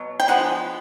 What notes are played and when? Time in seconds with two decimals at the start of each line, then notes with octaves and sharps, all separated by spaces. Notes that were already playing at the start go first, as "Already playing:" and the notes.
Already playing: B2 F#3
0.20 G5
0.28 D3 F3 G#3 B3 F#5